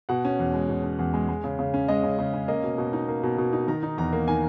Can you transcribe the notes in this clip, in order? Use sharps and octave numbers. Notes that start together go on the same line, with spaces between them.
B2 F#5
C#4
E2
G#3
B2
C#4
E2
G#3
G#3
C#3
C#3
C#4
G#3 D#5
C#3
C#3
C#4
A#3 D#5
B2
B2
D#4
A#3
B2
B2
D#4
D#3 A#5
D#4
E2 A#5
A#3
D#3 G#5